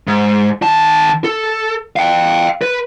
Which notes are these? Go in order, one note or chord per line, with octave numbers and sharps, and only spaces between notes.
G#2
D#3 A5
A4
F5 G5
B4